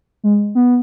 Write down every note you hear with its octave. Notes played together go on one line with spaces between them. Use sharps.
G#3
B3